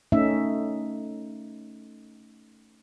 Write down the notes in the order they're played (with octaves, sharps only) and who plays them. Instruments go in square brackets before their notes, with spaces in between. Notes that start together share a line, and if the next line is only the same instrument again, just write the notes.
[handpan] A3 C#4 D#4 E5